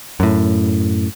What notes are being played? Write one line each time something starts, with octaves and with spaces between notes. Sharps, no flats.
F#2 A2